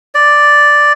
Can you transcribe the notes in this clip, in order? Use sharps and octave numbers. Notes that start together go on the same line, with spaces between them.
D5